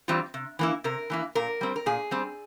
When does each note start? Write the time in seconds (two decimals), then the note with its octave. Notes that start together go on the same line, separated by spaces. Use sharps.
0.08 E3 G3 C4 F4
0.34 C3
0.59 E3 A#3 E4
0.84 C3 A#4
1.10 E3 A#3 E4
1.35 A#2 A#4
1.61 G3 C4
1.76 A#4
1.86 A#2 G#4
2.11 G3 C4